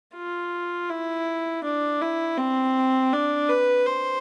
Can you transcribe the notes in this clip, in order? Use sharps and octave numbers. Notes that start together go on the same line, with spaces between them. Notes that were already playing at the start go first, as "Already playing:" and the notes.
F4
E4
D4
E4
C4
D4
B4
C5